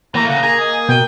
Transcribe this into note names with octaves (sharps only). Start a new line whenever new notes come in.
E3 A3 A#3 A#5
C#3 F#5 A#5
G#4 G#5 A#5
D#5
B2 G5